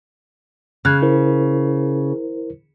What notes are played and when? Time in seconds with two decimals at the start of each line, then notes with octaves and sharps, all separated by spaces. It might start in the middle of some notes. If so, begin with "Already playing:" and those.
0.85 C#3 F6 F#6 G#6
1.02 E4 A#4 C5